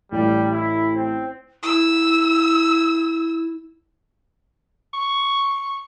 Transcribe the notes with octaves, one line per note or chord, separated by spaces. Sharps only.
A1 G3
E4
C4
E4 E6
C#6